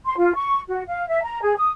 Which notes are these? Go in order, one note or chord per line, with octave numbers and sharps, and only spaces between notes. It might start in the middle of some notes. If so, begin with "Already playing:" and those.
C6
F4
C#6
F#4
F5
E5
A#5
G#4
D#6